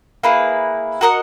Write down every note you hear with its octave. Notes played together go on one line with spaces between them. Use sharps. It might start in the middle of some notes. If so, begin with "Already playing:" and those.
A#3 E4 G#4 B4
F#4 A#4 D#5 F#5